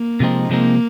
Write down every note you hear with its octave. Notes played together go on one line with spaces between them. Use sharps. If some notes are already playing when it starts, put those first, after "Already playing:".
Already playing: A#3
C3 F3 G#3 C4 D#4
C3 F3 G#3 A#3 C4 D#4